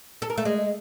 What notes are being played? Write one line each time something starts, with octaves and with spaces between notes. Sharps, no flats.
A4
A#4
A3
G#3